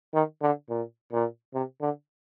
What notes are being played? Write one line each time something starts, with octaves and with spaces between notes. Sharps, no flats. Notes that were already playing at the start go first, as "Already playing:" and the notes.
D#3
D3
A#2
A#2
C3
D3